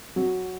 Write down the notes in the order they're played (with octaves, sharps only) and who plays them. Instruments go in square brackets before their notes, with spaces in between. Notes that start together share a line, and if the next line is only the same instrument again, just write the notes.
[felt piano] F#3